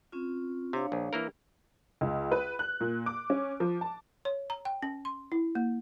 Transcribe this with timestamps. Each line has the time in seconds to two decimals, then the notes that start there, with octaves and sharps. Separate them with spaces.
0.12 C4 C#4 F4
0.73 C3 D4 C#5 F5
0.92 A#1
1.13 E3 A#3 A#4
2.01 C#2
2.32 B4
2.59 F#6
2.81 A#2
3.06 D6
3.30 C#4
3.60 F3
3.81 A5
4.25 C#5
4.50 A#5
4.65 G5
4.83 C#4
5.05 C6
5.32 E4
5.55 A#3